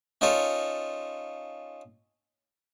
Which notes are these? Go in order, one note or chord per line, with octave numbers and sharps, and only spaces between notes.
C#4 D#4 F4 A4 A#4 C#5